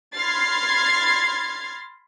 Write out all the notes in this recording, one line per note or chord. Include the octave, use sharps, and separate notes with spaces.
B5 C6 F6 G#6 A6 C7